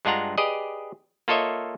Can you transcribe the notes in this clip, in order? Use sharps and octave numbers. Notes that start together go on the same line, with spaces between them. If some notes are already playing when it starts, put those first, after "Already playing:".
G2 G#3 D4 F4 F#5 A#5
G4 G#4 B4 D5 D#5
A#3 F4 A4 C#5 D#5 E5